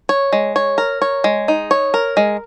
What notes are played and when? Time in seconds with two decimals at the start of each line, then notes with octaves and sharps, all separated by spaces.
0.09 C#5
0.33 G#3
0.56 C#5
0.78 A#4
1.02 C#5
1.24 G#3
1.48 D#4
1.71 C#5
1.94 A#4
2.17 G#3